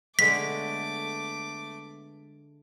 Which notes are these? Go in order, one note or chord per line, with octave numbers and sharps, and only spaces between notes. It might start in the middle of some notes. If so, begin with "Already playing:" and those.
D3 G#3 A3 B3 D6 B6